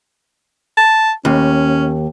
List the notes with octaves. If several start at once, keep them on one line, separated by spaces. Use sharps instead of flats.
A5
D#2 C#4